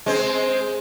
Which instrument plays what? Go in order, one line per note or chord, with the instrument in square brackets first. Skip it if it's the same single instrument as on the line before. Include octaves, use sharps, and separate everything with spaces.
[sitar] G#3 C4 C5